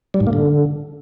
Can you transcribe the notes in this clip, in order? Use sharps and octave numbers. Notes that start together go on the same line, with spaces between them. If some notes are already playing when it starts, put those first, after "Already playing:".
G3
G#2
A#3
D3